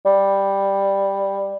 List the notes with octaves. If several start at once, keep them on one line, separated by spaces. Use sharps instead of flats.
G3